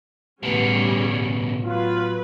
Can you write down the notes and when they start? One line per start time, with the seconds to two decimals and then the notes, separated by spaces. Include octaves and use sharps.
0.43 A1 B2 D3 G3 B3 C#4 G#4
1.64 F#3 F4 B4